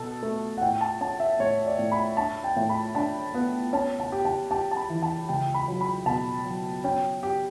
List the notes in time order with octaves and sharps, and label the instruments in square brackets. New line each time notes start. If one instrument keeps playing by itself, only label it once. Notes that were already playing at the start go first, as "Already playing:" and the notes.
Already playing: [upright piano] B2 A4 [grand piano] A5
[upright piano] A3
[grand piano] F#5
[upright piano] A2 [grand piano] G5
[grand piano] A5
[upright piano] C#4 [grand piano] A5
[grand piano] E5
[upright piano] A2 [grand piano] C#5
[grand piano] D5
[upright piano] A2
[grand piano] B5
[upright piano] D4 [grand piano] A5
[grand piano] G5
[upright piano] A2
[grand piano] B5
[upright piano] D4 [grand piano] A5
[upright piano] B3
[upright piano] C#4 [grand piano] A5
[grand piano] A5
[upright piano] G4
[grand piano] A5
[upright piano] G4 [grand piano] A5
[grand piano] A5
B5
[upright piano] E3
[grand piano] A5
[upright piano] C#2 [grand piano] G5
[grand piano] B5
[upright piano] F#3
[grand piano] B5
[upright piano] B2 [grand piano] A5
[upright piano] F#3
[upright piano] C#4 [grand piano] G5
[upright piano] G4